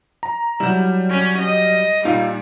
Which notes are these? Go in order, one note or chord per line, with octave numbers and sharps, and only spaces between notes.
A#5
F#3 G3 E4 G6
C#4
D#5
A#2 G3 D#4 F5